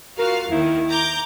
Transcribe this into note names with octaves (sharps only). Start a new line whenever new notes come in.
F4 F#4 A#4 F5
D#2 D#3 E4
A#5 D6 G6